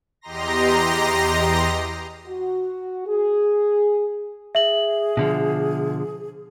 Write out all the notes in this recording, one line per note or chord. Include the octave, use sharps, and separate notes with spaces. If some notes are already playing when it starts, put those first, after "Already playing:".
E2 G4 D#5 A#5 C6 A#6
F#4
G#4
G#4 E5 F#7
B2 D3 F3